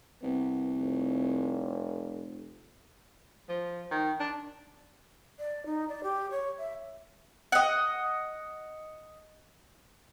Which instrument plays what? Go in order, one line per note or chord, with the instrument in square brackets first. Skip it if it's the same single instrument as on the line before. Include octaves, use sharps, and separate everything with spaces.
[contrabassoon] C2 [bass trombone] B3
[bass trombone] F1
[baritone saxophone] F3
D#3
D4
[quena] D5
D#4
D5
G4
C#5
E5
[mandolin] D#5 F#5